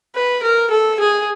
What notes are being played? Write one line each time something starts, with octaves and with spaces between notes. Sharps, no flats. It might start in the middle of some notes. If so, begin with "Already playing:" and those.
B4
A#4
A4
G#4